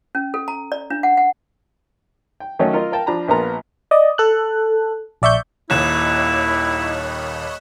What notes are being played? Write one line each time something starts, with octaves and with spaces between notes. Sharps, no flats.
C#4
A4
A#5
D5
D4
F#5
F#5
G5
D#3 F#3 A3 C#4 D#4 C#5
F4 A#4 D#5
A#4 F5 G5 A5
F3 D4 A#5 B5
A#1 A#2 B3 F4 A#4 A#5
D5 D#5
A4 F#6
A#1 D5 E5 C#6 G6
D#1 D#2 E4 C#5 D#5 B5 F#6 E7